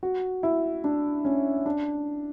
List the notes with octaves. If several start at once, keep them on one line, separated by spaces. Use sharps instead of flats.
F#4
E4
D4
C#4
D4